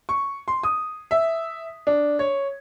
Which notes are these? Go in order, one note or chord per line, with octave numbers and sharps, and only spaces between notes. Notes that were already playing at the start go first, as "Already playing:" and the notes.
C#6
C6
D#6
E5
D4
C#5